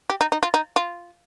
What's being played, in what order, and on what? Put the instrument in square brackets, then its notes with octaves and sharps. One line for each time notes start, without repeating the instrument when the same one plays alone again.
[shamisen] G4
D#4
D#4
F4
D#4
F4